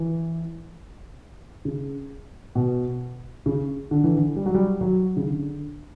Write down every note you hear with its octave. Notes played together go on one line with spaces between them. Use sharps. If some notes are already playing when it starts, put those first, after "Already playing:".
Already playing: E3
C#3
B2
C#3
D3
E3
D3
G3
F#3
G3
F#3
C#3
D3